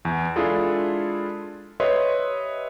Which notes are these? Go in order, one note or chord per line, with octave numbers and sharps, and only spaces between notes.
E2
G#3 D4 E4 F4 G#4 A4
G4 B4 C#5 D#5 E5 C6